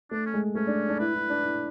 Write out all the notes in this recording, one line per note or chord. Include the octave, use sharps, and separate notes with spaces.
A3 D4
C#4
G#3
A3 C#4
D4
D4
E4 B4
E4
D4
E4